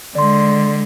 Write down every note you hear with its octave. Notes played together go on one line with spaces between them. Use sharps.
D3 G#3 D5 C6